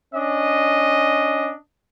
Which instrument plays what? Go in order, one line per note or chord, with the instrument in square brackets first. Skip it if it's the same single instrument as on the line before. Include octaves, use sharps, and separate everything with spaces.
[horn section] C#4 D4 D#5